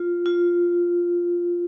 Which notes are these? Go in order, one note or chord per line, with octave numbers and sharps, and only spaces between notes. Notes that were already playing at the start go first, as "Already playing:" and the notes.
Already playing: F4
F4